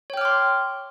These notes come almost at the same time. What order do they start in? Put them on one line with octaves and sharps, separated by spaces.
C#5 G5 F6 D6 C6